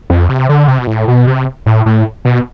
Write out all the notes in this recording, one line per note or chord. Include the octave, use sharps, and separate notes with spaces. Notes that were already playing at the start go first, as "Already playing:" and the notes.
F2
C3
D3
C3
B2
A2
B2
C3
A2
A2
B2